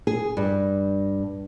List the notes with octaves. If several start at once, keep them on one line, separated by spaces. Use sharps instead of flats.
G#4
G2